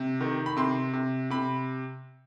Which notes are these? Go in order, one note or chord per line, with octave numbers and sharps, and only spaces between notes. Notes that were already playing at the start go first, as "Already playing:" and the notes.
Already playing: C3
D#3
B5
C3 C6
C3
C3 B5